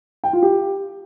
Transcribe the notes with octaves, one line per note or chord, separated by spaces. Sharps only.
G5
F4
G4